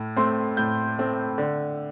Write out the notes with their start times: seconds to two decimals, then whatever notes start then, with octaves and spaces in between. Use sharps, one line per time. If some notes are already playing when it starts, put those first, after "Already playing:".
Already playing: A2
0.16 A3 C4 C6
0.57 A2 G6
0.98 A3 C4
1.38 D3